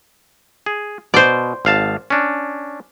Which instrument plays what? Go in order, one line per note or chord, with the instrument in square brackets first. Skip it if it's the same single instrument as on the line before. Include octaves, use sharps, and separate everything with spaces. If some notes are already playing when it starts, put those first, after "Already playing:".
[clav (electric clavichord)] G#4
[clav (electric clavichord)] B2 [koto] C5 D5
[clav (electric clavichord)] G#1 F5 A5
C#4 D4